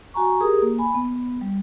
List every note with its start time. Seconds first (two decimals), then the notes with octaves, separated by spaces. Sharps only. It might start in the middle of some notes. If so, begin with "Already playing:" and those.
0.14 F#4 G#5 A#5 C#6
0.40 G4 G#4 A#4 D#6
0.62 A#3
0.79 G#5 B5
0.94 B3
1.41 G3